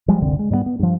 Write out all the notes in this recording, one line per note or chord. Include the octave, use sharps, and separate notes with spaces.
F3 G3 G#3
F#1 C2 D3 C4
G#3
G#2 G3 A3 B3
B3
G2 F3